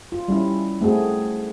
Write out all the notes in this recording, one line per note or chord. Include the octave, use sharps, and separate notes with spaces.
F4
G3 C#4 E4
A3 C4 F#4 G#4